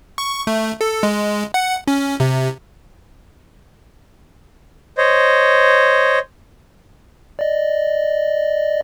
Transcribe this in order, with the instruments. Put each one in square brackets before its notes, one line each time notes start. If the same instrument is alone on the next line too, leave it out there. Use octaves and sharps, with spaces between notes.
[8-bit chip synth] C#6
A3
A4
G#3
F#5
C#4
C3
[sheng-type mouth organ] C5 C#5 D#5
[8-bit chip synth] D5 D#5